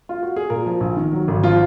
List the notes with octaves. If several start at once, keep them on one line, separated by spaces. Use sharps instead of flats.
F4
F#4
G#4
A#2 A#4
F3
A#1
D#3
F#3
G#1
F3 F4